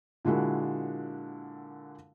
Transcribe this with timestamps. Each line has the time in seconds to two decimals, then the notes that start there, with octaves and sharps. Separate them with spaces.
0.25 A#2 D3 G#3 E4 F#4 A#4